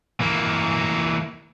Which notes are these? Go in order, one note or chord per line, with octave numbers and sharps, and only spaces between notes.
E3 A#3